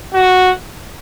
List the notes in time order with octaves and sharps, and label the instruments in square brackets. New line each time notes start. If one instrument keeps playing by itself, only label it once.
[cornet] F#4